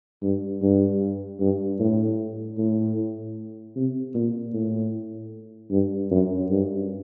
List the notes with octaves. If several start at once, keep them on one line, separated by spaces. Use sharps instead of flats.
G2
G2
G2
A2
A2
C3
A#2
A2
G2
F#2
G2